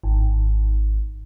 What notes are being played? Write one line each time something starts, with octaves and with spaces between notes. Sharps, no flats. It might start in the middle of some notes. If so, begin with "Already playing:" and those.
G#1